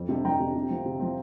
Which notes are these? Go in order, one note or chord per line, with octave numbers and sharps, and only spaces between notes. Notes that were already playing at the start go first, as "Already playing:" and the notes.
Already playing: F2
C3 G3 D4
F2 G5 A#5
C3 G3 D4
C3
F3 C4
C3
F3 C4